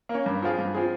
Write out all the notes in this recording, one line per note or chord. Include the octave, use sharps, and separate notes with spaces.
A#3 C#4
G2
F3 C4 F4 G#4
G2
F3 C4 F4 G#4